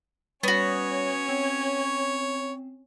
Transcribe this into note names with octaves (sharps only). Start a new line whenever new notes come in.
G3 B3 C#4 F#4 C#5
C4